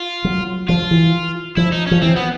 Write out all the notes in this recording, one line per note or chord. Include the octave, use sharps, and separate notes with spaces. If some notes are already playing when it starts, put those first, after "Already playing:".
Already playing: F4
F#3
F3 F4
E3
F3 E4
D#4
F3 C#4
E3 C4
B3